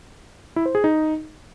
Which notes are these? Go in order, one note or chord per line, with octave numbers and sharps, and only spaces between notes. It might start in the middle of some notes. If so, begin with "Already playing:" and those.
E4
C5
G#4
D#4